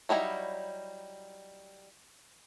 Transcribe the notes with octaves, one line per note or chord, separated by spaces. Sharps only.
F#3 G3 D#4 E4